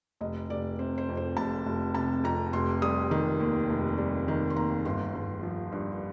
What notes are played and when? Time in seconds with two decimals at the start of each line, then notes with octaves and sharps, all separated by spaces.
0.21 F1 D#5
0.49 F1 D5
0.79 C3 C5
0.98 C5
1.09 F2
1.17 C5
1.37 F1 A5
1.66 F1
1.95 C3 A5
2.24 F2 A#5
2.53 F1 C6
2.82 G3 D#6
3.11 D#3
3.40 D#2
3.69 F1
3.98 G3
4.28 D#3
4.50 C6
4.56 D#2 A#5
4.85 G1 C6
5.15 G1
5.43 F3
5.72 G2